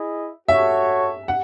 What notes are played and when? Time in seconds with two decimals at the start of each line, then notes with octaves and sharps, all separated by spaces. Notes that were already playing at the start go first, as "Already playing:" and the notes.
Already playing: E4 G#4 D#5
0.48 F#4 A4 C#5 E5
1.28 F#5